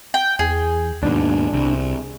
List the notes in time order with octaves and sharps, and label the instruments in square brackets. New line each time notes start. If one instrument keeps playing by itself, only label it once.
[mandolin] G5
[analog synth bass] E2 [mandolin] G#4
[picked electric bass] D#2 G#2 B2 [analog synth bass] D4
[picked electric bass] C2